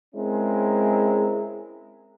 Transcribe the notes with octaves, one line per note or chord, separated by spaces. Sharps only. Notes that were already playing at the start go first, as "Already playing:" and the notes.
G#3 C4 C#4 E4 A#4